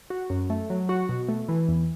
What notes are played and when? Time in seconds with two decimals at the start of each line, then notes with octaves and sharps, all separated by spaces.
0.10 F#4
0.30 F#2
0.50 A3
0.70 F#3
0.89 F#4
1.09 B2
1.29 A3
1.49 E3
1.68 E2